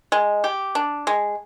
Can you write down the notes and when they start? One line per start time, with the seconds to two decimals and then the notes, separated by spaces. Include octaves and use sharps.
0.12 G#3
0.44 G4
0.75 D4
1.07 G#3